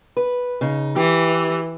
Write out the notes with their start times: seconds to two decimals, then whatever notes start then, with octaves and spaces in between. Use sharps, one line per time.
0.17 B4
0.61 C#3 D#4
0.96 E3 G4